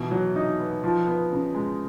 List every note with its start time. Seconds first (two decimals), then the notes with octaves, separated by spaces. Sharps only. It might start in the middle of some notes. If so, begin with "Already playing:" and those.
Already playing: B2 E3
0.11 F#3
0.36 D#4
0.59 B3
0.84 F3
1.07 B3
1.32 C#3
1.55 G#3